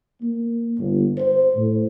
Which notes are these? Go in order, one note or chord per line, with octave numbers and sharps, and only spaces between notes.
A#3
G1
C5
A2